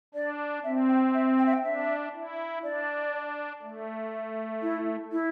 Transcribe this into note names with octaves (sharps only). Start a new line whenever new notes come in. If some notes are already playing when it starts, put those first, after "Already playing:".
D4 D5
C4 E5
G5
E5
G5
E5
G5
D4 E5
E4
D4 D5
A3
E4
E4